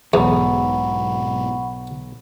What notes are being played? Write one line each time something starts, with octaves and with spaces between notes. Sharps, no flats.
B1 E2 G#2 B2 F#5 B5 C#6